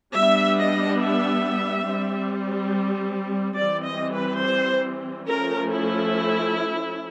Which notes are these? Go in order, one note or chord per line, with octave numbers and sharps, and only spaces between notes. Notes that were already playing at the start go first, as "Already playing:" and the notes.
G3 B3 D4 E5
D#5
E5
G3 C4
E3 G3 C4 D5
D#5
B4
C5
F3 A3 C#4 A#4
E4